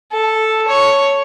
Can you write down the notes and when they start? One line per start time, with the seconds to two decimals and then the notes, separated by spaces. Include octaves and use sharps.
0.11 A4
0.68 C#5